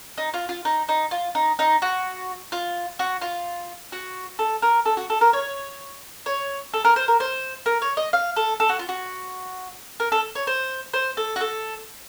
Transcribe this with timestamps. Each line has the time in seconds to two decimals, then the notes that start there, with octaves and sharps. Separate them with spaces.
0.18 D#4
0.34 F4
0.49 F4
0.65 D#4
0.89 D#4
1.11 F4
1.35 D#4
1.59 D#4
1.82 F#4
2.52 F4
2.99 F#4
3.22 F4
3.92 F#4
4.39 A4
4.62 A#4
4.86 A4
4.97 F#4
5.10 A4
5.21 A#4
5.33 C#5
6.26 C#5
6.74 A4
6.85 A#4
6.96 C5
7.08 A#4
7.20 C5
7.66 A#4
7.82 C#5
7.97 D#5
8.13 F5
8.36 A4
8.60 A4
8.69 F#4
8.79 F4
8.89 F#4
10.00 A#4
10.12 A4
10.35 C#5
10.47 C5
10.94 C5
11.17 A4
11.36 F#4
11.41 A4